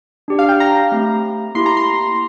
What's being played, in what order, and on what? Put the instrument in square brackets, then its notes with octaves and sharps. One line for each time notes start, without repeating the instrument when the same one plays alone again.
[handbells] D4 G4 D5
[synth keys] F5
G5
A#5
[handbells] A3 C4 G4
[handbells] A#3 E4 G4 [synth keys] C6
[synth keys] A#5
C6